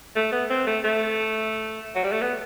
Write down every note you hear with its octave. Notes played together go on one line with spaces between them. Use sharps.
A3
B3
C4
A3
A3
F#3
G3
A3
B3